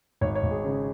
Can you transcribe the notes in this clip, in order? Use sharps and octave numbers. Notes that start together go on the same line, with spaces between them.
G#1 C#5
C#5
G#1
G#4
C#3